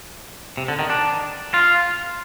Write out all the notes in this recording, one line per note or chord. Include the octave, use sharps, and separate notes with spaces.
C3
D3
D#3
D4
F4